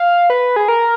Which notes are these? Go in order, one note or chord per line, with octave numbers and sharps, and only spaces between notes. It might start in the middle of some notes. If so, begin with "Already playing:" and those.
Already playing: F5
B4
G#4
A#4